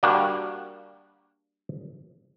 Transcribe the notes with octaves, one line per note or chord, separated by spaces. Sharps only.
G3 A#3 D4 F#4